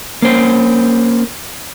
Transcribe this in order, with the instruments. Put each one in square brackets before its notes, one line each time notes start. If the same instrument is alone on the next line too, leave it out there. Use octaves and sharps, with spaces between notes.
[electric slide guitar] A#3 C#4 C5